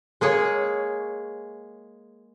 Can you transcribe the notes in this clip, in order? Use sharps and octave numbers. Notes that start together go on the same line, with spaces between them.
G#3 A#3 G#4 C#5